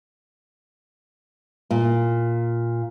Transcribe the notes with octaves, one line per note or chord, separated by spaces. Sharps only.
A#2